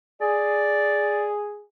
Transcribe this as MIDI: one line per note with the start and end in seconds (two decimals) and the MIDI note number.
0.21 1.64 68
0.21 1.29 74